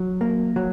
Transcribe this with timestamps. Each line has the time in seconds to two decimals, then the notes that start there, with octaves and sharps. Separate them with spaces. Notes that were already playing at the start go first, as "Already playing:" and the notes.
Already playing: F#3
0.21 A#3
0.56 F#3